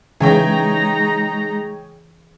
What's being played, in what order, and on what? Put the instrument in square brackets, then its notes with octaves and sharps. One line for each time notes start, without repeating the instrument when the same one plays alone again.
[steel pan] C#3 E3 [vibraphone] G#3 [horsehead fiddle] D#4 A#5 [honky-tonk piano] G#4 C#5 G5